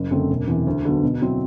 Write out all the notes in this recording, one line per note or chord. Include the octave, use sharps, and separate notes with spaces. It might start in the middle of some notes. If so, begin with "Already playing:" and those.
Already playing: F#1
F#2 D3 A3 C4
E1
E2 C3
D2
D3 F#3 B3
B2
F#3 C4 E4